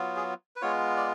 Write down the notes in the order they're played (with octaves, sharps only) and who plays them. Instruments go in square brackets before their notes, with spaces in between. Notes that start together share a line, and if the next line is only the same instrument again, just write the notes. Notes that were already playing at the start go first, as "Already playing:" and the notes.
Already playing: [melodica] F#3 B3 F4
G#4
B4
G#3 B3 F4 C#5
D5